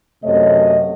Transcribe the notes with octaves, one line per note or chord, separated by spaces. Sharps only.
F#2 C3 A3 C#5 D#5